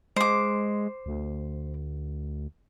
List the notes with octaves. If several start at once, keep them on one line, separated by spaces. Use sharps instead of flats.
G#3 C5 D6
D2